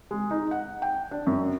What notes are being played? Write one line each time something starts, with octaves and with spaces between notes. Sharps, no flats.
G#3
D#4
F#5
G5
D4
F#2